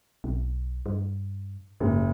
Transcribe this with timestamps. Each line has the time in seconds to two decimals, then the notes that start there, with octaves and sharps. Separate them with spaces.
0.24 B1
0.86 G2
1.80 F#1 G#2